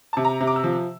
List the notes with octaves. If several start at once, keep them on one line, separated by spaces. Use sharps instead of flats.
C3 A5
A#5
C3
D6
E6
F3